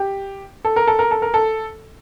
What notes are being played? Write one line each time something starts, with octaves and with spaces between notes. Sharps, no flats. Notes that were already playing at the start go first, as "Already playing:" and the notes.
Already playing: G4
A4
A#4
A4
A#4
A4
A#4
A4